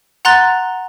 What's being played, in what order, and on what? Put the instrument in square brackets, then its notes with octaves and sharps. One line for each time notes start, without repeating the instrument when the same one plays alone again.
[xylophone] F#5 A#5 C6 F#6 A6